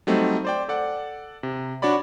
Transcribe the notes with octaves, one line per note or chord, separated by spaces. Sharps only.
F#3 G3 A3 C4 D#4
C5 D5 G5
A4 D5 F#5
C3
D4 F#4 C#5 D5 B5